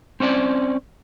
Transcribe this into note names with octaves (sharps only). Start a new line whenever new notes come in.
C4 C#4 C5 D5